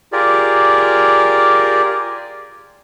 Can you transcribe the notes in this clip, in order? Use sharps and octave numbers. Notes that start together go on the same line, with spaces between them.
F4 G4 G#4 A#4 D5